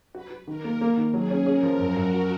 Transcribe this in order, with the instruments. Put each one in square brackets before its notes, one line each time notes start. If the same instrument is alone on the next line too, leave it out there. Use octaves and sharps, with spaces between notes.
[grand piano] F#4 [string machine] B4
[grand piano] F#4
[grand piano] D#3 [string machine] A#4
[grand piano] A#3
A#3
D#3
[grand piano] F#3 [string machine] G#4
[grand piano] C#4
[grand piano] C#4 [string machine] A#4
[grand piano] F3
[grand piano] F#2 [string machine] F#4
[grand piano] F#2